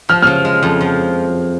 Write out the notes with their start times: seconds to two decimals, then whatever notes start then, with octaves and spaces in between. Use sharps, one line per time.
0.09 F3 F6
0.22 C#3 F6
0.45 G#3
0.63 F2
0.81 F3